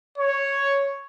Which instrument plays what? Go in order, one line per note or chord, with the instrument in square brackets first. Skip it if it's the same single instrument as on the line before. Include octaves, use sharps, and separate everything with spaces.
[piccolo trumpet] C#5